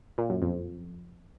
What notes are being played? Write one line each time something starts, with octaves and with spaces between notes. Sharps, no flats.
A#2
F#2
F2